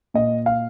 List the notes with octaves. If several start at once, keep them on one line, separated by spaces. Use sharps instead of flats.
A#2 D#5
F5